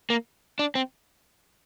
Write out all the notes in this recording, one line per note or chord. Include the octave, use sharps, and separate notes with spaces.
A#3
D4
C4